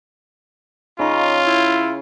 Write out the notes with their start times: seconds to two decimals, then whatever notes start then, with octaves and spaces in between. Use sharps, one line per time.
0.99 C#3 D#4 F4
1.46 E4